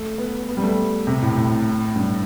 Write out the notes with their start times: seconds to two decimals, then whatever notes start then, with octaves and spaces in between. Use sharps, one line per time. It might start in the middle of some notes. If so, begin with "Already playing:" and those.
Already playing: A3
0.18 B3
0.49 B3
0.57 G3
0.63 A3
1.07 C3
1.22 A2
1.36 A2
1.96 G2